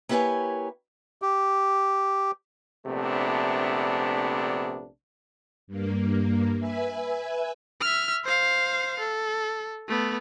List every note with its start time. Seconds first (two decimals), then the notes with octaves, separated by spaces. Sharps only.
0.09 A#3 E4 G4 B4 C#5 G#5
1.22 G4
2.87 A#1 C3 A3 B3 D4
5.67 G2 A#3
6.60 B4 E5 G#5
7.81 E5 F6
8.24 C5 F5
9.00 A4
9.88 A3 B3